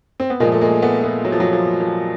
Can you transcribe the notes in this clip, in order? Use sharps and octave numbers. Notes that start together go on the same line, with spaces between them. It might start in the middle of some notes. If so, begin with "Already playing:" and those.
C4
B3
A#2 F3 G#3 A#3
A3
G#3 A#3
A3 B3
A3 B3
F#3
F3
F#3
F3
F3